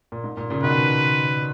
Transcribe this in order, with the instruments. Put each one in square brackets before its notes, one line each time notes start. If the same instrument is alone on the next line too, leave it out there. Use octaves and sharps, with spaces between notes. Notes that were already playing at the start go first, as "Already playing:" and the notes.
[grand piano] A#2
G#2
A#2
A#2 C#3
[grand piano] B2 D#3 [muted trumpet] B4